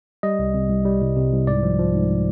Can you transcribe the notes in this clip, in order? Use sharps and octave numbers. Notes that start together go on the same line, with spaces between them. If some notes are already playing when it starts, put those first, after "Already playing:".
G3 D#5
C2
C3
C2
G3
C2
C3
C2
G#2 D5
F3
F3
G#2